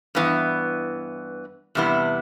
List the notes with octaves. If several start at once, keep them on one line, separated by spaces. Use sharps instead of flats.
G2 E3 B3
E2 C3 G3 B3 E4